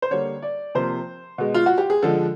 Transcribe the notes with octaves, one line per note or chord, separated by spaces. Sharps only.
C5
D3 G3 A#3 C#5
D5
C3 F3 A#3 C5
B2 G#3
F4
F#4
G4
G#4
D3 F3 G#3 A4